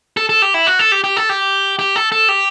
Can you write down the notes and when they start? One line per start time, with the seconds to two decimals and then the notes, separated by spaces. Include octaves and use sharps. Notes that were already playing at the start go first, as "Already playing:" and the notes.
0.17 A4
0.29 A4
0.42 G4
0.54 E4
0.67 F#4
0.79 A4
0.92 G4
1.04 G4
1.16 A4
1.29 G4
1.79 G4
1.96 A4
2.12 A4
2.29 G4